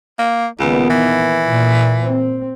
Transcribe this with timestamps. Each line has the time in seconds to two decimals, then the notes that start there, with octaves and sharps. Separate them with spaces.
0.19 A#3
0.59 C#2 A#2 D#3 B3
0.90 E3
1.42 A#2
2.03 C4